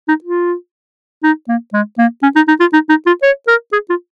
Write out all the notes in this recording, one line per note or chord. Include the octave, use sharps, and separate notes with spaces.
D#4
F4
D#4
A#3
G#3
A#3
C#4
D#4
D#4
F4
D#4
D#4
F4
C#5
A#4
G#4
F4